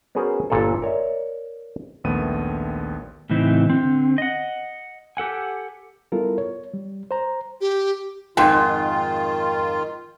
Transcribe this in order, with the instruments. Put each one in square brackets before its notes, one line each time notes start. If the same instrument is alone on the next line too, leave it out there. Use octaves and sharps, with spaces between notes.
[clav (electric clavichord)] B3 C#4 F#4 G#4 A#4 C5
G1 A#2 A4
A#4 C#5 D5 E5
[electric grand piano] A#1 D#2 A3 B3 D#7
[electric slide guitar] A2 C#3 E3 C4 D#4 E4
D3 C4
D#5 F#5
G4 A4 F#5 G#5
[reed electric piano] G3 B3 E4 F4 A4 A#4
C#5
G3
C5 A#5
[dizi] G4
[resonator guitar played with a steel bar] F2 G#2 [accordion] D#3 F4 [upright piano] G5 C6